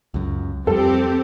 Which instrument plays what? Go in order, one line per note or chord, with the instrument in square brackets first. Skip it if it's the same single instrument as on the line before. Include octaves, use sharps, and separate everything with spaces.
[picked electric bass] C#2 F#2
[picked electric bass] F2 G3 [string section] C4 G4 [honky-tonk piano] A4